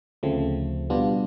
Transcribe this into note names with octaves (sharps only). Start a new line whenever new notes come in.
D2 C#3 F3 A3 C4
B2 G3 B3 D4 F4